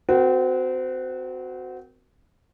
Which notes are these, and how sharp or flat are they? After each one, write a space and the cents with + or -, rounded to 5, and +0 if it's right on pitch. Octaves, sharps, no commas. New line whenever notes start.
C4 -30 F#4 +0 A#4 +0